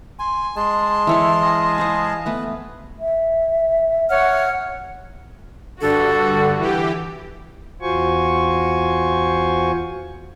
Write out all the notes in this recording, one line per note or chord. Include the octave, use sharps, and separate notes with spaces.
G#5 C6
G#3 G#4 A5 C6
E3 E4 A4 C#5 D5
D#5 F5 G#5
B4 C5 F#5
A3 B3 B4
E5
C#5 F#5 F6
G2 D3 F#4 A4
E3 G4
E2 F4 F#4 C5 G#5 C#6